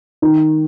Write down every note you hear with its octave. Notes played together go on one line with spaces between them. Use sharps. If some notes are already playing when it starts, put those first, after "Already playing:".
D#3